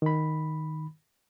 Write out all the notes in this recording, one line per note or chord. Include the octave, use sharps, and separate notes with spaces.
D#3 B5